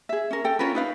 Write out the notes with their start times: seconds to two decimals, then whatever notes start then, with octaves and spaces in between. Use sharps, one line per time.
0.09 G#4 E5
0.31 C#4 A#4
0.44 A4 G5
0.59 C#4 F4 A#4 B4
0.75 D#4 B4 F5